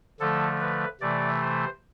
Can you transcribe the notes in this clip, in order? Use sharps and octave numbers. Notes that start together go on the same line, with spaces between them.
D3 F3 A3 A4
B4
C3 E3 A3 D5
C5